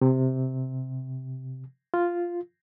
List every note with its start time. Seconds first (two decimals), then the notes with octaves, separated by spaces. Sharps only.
0.01 C3
1.94 F4